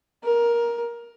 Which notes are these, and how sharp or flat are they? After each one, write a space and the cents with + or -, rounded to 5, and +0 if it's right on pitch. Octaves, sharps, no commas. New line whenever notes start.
A#4 +15